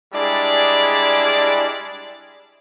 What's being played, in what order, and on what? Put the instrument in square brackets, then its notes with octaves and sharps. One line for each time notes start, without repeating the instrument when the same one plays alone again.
[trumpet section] G3 G#3 D4 E4 G#4 D5